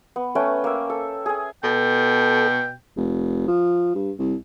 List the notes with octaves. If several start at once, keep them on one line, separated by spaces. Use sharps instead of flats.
B3
A3 C#4 B4 G5
A#3 E5
A4
G#4 G#5
B2 A4 G5
F1
F3
G2
C2